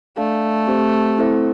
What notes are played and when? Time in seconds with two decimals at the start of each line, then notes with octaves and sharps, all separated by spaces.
0.17 A3 D4 A4 D5 F5 A5
0.67 C4 G4 C5
1.18 C4 E4 A4 C5 E5